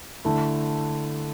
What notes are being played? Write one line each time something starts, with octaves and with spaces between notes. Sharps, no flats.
D3 A3 E4